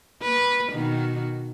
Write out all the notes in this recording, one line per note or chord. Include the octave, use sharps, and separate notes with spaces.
A#3 B4
B2 D#3 F#4